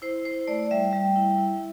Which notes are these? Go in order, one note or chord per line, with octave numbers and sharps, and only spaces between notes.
E4 C5
E4 C5
A3 D5
G3 E5
G3
E4
E4